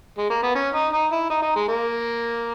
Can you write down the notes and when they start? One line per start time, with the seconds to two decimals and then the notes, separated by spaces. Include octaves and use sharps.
0.18 G#3
0.30 A#3
0.43 B3
0.55 C#4
0.74 D#4
0.93 D#4
1.12 E4
1.30 D#4
1.42 D#4
1.56 G#3
1.68 A#3